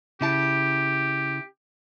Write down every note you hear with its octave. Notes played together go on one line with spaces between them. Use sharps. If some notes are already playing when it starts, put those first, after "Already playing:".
C#3 E4 G4 A5